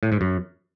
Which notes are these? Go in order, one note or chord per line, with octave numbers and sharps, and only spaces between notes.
A2
G#2
F#2